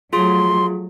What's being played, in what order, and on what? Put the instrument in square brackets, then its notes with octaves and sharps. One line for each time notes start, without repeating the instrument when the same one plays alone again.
[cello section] F3 F#3 A3 [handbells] F4 G#4 [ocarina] C6